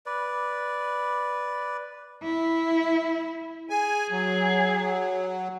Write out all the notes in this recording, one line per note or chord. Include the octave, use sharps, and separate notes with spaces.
B4 D5
E4
G#4 G#5
F#3